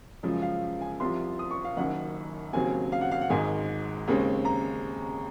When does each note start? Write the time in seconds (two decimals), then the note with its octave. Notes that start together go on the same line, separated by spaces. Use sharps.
0.23 F#2 C#3 F3 G#3
0.42 F5
0.81 G#5
1.00 C2 C3 F3 C6
1.39 D#6
1.51 C#6
1.64 F5
1.77 F#1 F#2 D#3 F#5
2.53 D#2 C#3 F#3 C4 G#5
2.92 F5
3.01 F#5
3.11 F5
3.21 F#5
3.30 G#1 G#2 D#3 G#3 G#5
4.08 D#2 C#3 G#3 C4
4.45 A#5